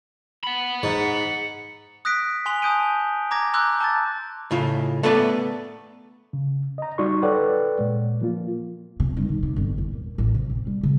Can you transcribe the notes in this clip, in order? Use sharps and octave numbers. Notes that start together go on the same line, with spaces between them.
F#5 B5
G#2
D#6 F#6 A#6 B6 D7
G#5 C6 F#6 F7 G7
G#5 A5 D#6 G6 D7 D#7
A#5 D6 G#6 A#6
A#5 C6 D6 E6 F#6 G6
A5 D6 F#6 A6
A2 C#3 F4
A3 B3 A4 B4 D5
C#3
D#5 A#5
G3 D#4 F#4 D5 C6 C#6
A4 B4 C#5 D5 F#5 G5
A#2 G#3
F3 A#3 F4
C3
G2
D#3
C3
G1
E2
A#2
A1
C3
C4
G3
C#3